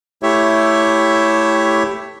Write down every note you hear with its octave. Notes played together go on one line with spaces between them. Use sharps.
A3 E4 G4 C#5 E5